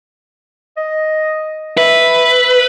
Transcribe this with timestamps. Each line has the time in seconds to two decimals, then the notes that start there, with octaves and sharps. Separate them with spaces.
0.77 D#5
1.78 B4 E5